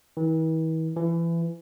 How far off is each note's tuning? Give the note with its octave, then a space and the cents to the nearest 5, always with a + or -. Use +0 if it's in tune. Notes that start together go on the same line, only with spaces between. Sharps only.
E3 -45
E3 +25